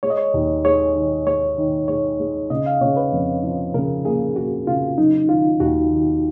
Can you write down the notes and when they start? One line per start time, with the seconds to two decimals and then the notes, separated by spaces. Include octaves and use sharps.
0.03 G#3 C#5
0.10 D#5
0.17 C#5
0.34 D#2
0.65 G#3 C#5
0.95 D#3
1.26 G#3 C#5
1.58 D#3
1.88 G#3 C#5
2.20 G#3
2.50 C#3 D#5
2.66 F5
2.81 C#3 C#5
2.97 B4
3.12 F2
3.43 F3
3.74 C#3 A#4
4.05 A#3 G#4
4.36 A#3 F#4
4.67 C#3 F4
4.98 F#3 D#4
5.29 D#3 F4
5.60 D#2 F#4
5.91 D#3